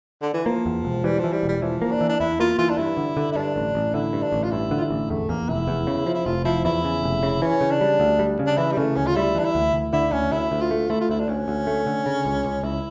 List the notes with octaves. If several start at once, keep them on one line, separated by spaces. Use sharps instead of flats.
D3
E3
F3 A#3
E2
E1
E3 G3
E3 F3
G3
E1
G3
E3 F3
A#3
D4
E3
D4
E2 E4
A#3 F4
E3 F4
D4
G2 E4
D3
D3
E4
G2 D4
A1
A1
D3 E4
G2
D4
A1
F4
G2 E4
D3
F4
E4
A1
E2 A3
E2 A#3
F1 E4
E2
C#3
F3
E4
F1 F4
F3 E4
E2 E4
C#3
F1
C#3
E3 C#4
C#3
D4
G3
D2
G3
C#3
D4
E3 E4
G3
C#3 A3
D2 C#4
F4
G3 E4
E3 D4
E4
D2
D2
D3 E4
D2 C#4
D2 E4
D2
F4
A3
A3 E4
F4
D2 E4
D4
D2 C#4
D2
A3
D3
C#3
C#2
C#2
C#2 E4